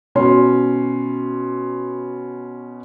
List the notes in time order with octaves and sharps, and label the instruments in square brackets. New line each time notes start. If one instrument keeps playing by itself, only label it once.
[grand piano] B2 C#4 C6